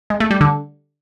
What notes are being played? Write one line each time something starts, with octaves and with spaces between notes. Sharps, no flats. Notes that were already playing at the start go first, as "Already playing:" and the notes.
G#3
A3
G3
D3